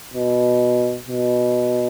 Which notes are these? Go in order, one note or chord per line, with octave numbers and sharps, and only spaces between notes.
B2
B2